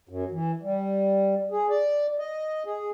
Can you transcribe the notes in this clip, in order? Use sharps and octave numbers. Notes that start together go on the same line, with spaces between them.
F#2
E3
G3
G#4
D5
D#5
G#4